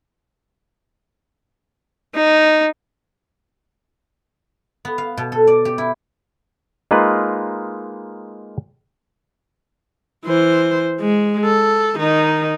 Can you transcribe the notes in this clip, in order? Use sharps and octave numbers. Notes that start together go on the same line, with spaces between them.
D#4
B3
F5
B2
A4
D5
G4
E4
G#3 A#3 D#4 F4 B4
E3 C5
G#3
A4
D#3 D#4